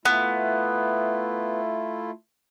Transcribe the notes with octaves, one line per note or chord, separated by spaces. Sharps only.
A3 B3 E4 F4